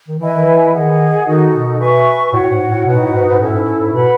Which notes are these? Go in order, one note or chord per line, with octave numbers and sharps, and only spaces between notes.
D#3
E3 E4 B4 D#5 G#5
D#3
E3
D#3 G#4 D#5 F#5
D#3 D#4 F#4 A4 D#5
B2
B4 E5 G#5 C#6
A2 F#4 C#5 F#5
A2
G#2
A2
B2 D#4 F#4 B4 F#5
A2
G#2
G#2
A2 C#4 E4 A4
G#2
G#2
B2 B4 F#5 B5